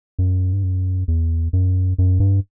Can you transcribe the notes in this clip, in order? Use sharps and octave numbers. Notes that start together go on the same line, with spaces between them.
F#2
G2
F#2
E2
F#2
F#2
G2